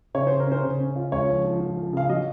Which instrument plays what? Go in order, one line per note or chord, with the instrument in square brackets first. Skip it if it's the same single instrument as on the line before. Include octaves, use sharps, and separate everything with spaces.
[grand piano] C#3 [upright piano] C#5
[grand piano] C#3 [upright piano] C5
[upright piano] A#4
[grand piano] C#4 [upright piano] C5
[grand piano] C#3
C#4
F4
[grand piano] C#2 [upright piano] C#5
[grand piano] F3
F3
F3
F3
[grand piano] C#3 [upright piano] F5
[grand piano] F#3 [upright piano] D#5